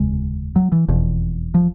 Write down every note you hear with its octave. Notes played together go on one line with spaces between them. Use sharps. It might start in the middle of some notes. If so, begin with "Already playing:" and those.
Already playing: F1 D#2 C#3 G#3
F#3
E3
F1 E2 B2
F3